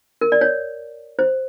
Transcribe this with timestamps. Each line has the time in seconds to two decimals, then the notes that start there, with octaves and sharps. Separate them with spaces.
0.21 A#4
0.32 D5
0.41 C#5
1.19 C5